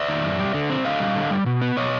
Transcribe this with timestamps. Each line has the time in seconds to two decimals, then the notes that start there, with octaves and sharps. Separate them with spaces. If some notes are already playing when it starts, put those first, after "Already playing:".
Already playing: D5 E5
0.09 D#3
0.24 F#2
0.39 G3
0.54 D3
0.70 C4
0.85 D3 D#5 F5
1.00 G3
1.16 D3
1.31 G3
1.46 B2
1.62 B3
1.77 B2 C#5 D#5